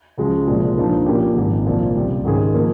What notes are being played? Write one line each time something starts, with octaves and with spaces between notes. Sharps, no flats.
C#2 C#3 F3 G#3
C2 A#2 F3 G#3
G2 F3 A#3 D#4
A#2 F3 A#3 C#4 G4
G#1 G#2 F3 C4
C2 A#2 F3
C#2 C3 G3
G#2 D#3 G#3 C#4 G#4
F3 A#3